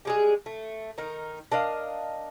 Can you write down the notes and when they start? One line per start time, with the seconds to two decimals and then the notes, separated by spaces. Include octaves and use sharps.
0.05 G3 G#3 G#4
0.46 A3
0.98 D#3 D#4 A#4
1.52 D4 A#4 D#5 F5